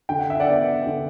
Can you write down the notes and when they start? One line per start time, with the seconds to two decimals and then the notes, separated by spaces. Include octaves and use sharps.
0.09 D3 G5
0.19 F#5
0.30 E5
0.40 D5 F#5
0.48 B3
0.87 D3